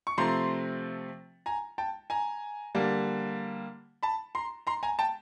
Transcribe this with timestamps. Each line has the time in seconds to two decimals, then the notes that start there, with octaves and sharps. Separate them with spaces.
0.07 C#6
0.18 C3 F3 A3 C4 A#5 C6
1.46 G#5 A#5
1.78 G5 A5
2.10 G#5 A#5
2.75 D3 G3 A#3
4.03 A5 B5
4.35 A#5 C6
4.67 A#5 C6
4.83 G#5 A#5
4.99 G5 A5